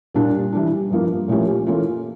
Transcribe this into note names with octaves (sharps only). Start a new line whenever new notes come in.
A#2 G3 D4
E3 G3 D4
G2 F3 A#3
A#2 F3 A3 C#4 G4
E3 A#3 C#4 F4 A4